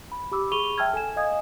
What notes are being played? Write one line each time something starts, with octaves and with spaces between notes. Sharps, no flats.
B5
G4 B5 D6 E6
G#4 B5 C#6 D#7 F7 G7
E5 G5 A5 E6 F6 G#6
A4 G#5 E7
D#5 F5 G#5 D#6 G#6